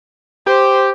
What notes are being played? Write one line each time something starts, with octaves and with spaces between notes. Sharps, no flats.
G4 C5